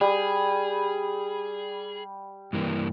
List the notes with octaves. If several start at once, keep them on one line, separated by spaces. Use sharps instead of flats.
G3 G#4
G2 E3 A#3